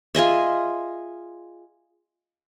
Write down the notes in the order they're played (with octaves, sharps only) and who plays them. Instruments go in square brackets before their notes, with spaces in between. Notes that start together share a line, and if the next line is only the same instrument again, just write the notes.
[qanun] F4 G#4 D#5 E5